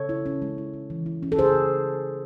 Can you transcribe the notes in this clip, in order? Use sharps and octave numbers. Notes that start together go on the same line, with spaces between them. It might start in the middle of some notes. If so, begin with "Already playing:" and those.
Already playing: C#3 A4 C#5
E4
C#4
G#3
E4
G#3
E3
E4
C#4
A4
C#3 G#4 C5